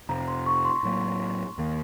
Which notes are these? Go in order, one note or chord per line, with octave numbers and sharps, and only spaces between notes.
F2 C3 F3 A#5
C6
C#6
C6
A2 F#3 A#3
D#2 D#3 A#3